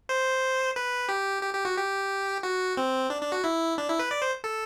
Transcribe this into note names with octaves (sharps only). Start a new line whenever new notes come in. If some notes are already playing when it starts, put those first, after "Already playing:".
C5
B4
G4
G4
G4
F#4
G4
F#4
C4
D4
D4
F#4
E4
D4
E4
B4
D5
C5
A4